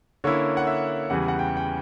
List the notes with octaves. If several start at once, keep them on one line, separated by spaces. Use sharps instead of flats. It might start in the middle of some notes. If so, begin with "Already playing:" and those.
D3 A#3 C#4 E4 C#5
F#5
E5
E2 C#3 E3 G3 F#5
F#5
G5
G5